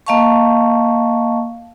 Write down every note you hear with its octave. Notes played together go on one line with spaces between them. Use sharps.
A#3 D#5 F5 A5 C#6